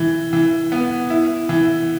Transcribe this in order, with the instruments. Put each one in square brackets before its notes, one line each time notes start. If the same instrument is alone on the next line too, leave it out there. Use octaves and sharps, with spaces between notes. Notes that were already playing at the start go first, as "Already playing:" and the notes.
Already playing: [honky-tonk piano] E3
E3
B3
E4
E3